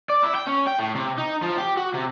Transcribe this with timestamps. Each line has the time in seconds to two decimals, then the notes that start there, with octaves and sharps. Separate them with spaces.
0.10 D5
0.23 E4
0.35 G5
0.47 C#4
0.67 G5
0.79 A2
0.95 C3
1.18 D#4
1.42 F3
1.58 G4
1.77 F#4
1.94 C3